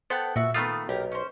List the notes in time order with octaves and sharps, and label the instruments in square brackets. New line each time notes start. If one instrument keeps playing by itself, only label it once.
[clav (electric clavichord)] B3 [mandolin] A4 F#5 G5 [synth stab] C5
[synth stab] A#2 [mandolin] F#4 E5
[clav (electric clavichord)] D#3 A3 F4 [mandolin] B3 B5 D#6
[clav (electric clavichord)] B1 [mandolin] G4 A#4
[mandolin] C#4 C5